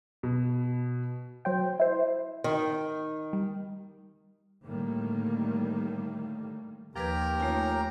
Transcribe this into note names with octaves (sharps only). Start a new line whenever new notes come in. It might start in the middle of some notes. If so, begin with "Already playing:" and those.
B2
F#3 C5 G5
E4 C5
D#3
G3
A2 D3 D#3 G3 A#3
D#2 F3 G4 A#4 B4 A#5 G#6
D#3 F3 A3 C#4 G#5